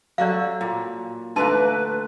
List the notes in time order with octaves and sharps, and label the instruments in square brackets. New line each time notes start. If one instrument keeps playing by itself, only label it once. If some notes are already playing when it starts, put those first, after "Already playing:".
[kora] F#3 F#4 A4 [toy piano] D5 F5
[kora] A#2
[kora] D3 A3 A#3 [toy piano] D#4 A5 C6 [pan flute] B4